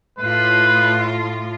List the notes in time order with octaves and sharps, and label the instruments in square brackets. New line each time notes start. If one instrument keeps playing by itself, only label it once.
[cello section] A2 F4 [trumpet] B4